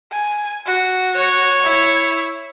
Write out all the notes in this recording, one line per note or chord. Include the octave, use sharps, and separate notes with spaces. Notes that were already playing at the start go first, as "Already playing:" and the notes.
G#5
F#4
C#5
E4